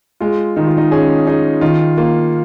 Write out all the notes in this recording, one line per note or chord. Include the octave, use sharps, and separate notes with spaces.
G#3 F4
D#3 D#4
F4
D#4
C#4 G#4
D#4 G#4
D#3 F4
A#3 F4